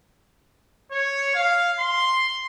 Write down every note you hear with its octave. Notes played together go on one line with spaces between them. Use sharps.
C#5
F5
C6